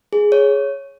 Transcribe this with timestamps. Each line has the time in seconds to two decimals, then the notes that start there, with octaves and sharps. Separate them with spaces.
0.13 G#4
0.32 C#5